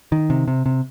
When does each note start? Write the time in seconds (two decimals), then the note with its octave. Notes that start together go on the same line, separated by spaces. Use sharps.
0.12 D#3
0.30 C3
0.48 C3
0.66 C3